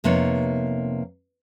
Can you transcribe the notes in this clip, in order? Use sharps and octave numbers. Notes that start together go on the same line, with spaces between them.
F2 C3 A#3 B3 D#4 C#5